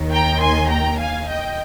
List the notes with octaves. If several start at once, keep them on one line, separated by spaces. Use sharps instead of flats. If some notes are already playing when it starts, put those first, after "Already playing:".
Already playing: D#2 D#3
G5 A#5
G#5 C6
G5 A#5
F5 G#5
D#5 G5